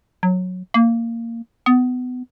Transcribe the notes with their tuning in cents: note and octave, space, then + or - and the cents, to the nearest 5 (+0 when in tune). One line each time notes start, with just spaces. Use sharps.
F#3 -15
A#3 -15
B3 +25